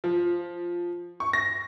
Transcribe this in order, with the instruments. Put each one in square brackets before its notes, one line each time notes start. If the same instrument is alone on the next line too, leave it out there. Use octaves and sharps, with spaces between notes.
[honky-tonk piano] F3
C#6
A#6